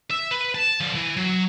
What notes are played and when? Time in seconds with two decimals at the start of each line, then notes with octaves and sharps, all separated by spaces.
0.10 E5
0.31 B4
0.55 A5
0.80 D3 F3
0.95 E3
1.17 F#3